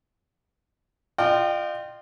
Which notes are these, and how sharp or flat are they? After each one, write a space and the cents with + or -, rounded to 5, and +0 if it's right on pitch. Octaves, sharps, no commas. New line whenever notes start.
F4 +0 D#5 -45 G5 -20